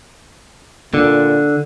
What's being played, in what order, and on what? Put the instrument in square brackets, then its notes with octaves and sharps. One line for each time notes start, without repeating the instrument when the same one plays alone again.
[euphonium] A#2 [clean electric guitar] D3